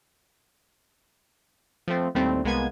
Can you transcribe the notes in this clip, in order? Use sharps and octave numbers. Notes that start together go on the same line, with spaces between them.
F3 A3 C4
D#2 A2 G3 A3 C4
C2 G#3 A#3 B3 G#5 G#6